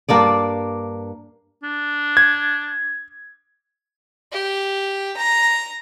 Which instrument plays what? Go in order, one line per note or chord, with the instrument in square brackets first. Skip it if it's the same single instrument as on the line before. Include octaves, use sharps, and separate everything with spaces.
[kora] G2 A#3 D4 D5
[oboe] D4
[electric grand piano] G#6
[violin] G4
A#5